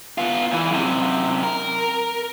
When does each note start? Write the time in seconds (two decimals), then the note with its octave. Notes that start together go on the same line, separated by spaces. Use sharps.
0.18 B3 F4
0.51 D2 E3
0.71 F#2 C3
1.43 A#4